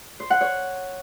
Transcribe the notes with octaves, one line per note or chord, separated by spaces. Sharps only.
C5
F#5
C#5